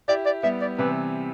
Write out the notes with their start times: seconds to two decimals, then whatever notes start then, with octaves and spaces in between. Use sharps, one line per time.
0.08 E4 G4 D5
0.26 D5
0.43 G3 B3 E5
0.61 D5
0.78 C3 E3 B4